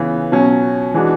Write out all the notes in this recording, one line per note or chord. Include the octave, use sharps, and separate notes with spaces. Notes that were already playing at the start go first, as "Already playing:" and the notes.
Already playing: C#3 E3 B3
B2 F#3 C#4
E3 G#3 D4 F#4